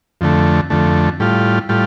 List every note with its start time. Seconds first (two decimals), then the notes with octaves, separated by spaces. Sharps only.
0.21 F2 D3 A3
0.70 F2 D3 A3
1.20 A2 G3 F4
1.69 A2 G3 F4